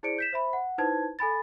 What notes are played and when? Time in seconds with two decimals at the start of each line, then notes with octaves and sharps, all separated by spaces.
0.03 E4 G#4 C5 D5 C#7 D7
0.18 G6 B6 E7
0.33 C5 E5 B5
0.53 F#5
0.78 D#4 E4 B4 C5 A5 G#6
1.19 A4 G#5 B5 A6